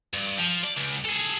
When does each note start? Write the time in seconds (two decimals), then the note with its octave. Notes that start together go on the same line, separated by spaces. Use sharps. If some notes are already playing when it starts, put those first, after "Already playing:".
0.14 G2
0.38 F3
0.64 D5
0.76 C#2
1.04 G#4 A4